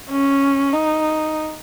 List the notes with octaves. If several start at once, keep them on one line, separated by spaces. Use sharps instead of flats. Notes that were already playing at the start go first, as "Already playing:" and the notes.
C#4
D#4